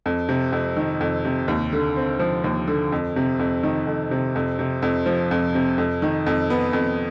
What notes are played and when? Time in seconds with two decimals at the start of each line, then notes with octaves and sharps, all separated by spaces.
0.06 F2
0.29 C3
0.52 F2
0.77 D#3
1.01 F2
1.25 C3
1.48 D#2
1.73 D3
1.97 C4
2.19 F3
2.44 D#2
2.68 D3
2.92 F2
3.16 C3
3.39 F2
3.63 D#3
3.87 F2
4.11 C3
4.36 F2
4.59 C3
4.82 F2
5.06 F3
5.31 F2
5.55 C3
5.78 F2
6.02 D#3
6.26 F2
6.50 B3
6.73 F2